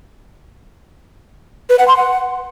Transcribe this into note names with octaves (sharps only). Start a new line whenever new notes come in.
B4
F#5
C6
F#5